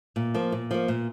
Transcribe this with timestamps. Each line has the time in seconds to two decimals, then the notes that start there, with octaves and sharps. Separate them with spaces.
0.16 A#2
0.34 F3 A#3
0.52 A#2
0.71 F3 A#3
0.88 A#2